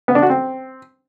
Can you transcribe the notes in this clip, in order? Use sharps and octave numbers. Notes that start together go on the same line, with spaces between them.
B3
D4
F#4
C4